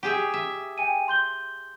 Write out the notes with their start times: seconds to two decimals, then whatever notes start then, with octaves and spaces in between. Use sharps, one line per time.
0.03 G4 G#4 E5
0.34 E5
0.78 G5 G#5 D#7
1.08 C6 G6 G7